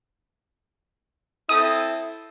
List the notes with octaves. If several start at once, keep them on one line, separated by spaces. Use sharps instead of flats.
C4 E4 A4 D#6